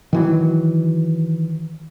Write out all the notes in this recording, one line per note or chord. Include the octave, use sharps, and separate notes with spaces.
D#3 E3 F#3